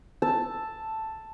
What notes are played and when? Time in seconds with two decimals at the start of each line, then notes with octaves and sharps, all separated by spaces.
0.22 A5 E6